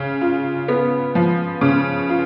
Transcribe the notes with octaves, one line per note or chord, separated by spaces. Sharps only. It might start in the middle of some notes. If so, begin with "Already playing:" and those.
Already playing: C#3
F4
B3
F3
C#3
F4